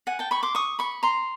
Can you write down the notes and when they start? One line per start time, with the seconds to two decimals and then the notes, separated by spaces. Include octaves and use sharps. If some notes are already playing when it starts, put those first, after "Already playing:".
0.07 F#5 G#5
0.19 G5 A5
0.31 B5 C#6
0.43 C6 D6
0.55 C#6 D#6
0.79 B5 C#6
1.03 A#5 C6